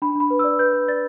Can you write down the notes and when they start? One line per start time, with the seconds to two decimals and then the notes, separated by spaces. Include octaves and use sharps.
0.02 D4 B5
0.15 D4 B5
0.30 B4
0.39 D5 E6
0.59 B4 G6
0.73 B4
0.88 D5 A6